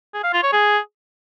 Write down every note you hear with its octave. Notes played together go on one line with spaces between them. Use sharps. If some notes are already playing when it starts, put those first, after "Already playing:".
G#4
F5
F4
C#5
G#4